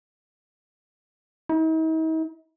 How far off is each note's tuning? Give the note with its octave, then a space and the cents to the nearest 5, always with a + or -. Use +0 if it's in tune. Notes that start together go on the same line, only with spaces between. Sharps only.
D#4 +45